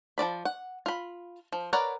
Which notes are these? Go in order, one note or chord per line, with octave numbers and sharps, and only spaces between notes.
F3 C4 D5 B5
F#5
F4 B5
F3
A#4 B4 C#5 D5 F#5